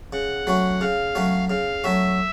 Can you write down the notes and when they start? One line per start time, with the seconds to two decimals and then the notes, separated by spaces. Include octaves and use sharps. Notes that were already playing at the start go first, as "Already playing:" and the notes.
0.13 C#3 F#5
0.47 F#3 A3 C#4 F#4
0.81 C#3 F5
1.15 F#3 A3 C#4 F#4
1.49 C#3 F5
1.83 F#3 A3 C#4 F#4 E5